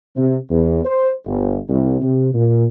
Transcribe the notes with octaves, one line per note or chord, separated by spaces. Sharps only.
C3
E2
C5
G1
C2
C3
A#2